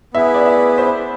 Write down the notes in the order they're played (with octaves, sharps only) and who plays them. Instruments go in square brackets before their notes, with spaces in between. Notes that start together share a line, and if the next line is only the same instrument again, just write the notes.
[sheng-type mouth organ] B3 E4 G#4 B4 [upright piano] E5
[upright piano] D5
E5
C5